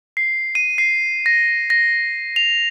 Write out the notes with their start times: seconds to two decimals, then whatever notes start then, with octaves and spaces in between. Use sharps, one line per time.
0.17 C7
0.55 D#7
0.78 C7
1.26 A#6
1.70 A#6
2.36 F7